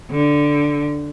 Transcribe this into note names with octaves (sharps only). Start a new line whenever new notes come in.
D3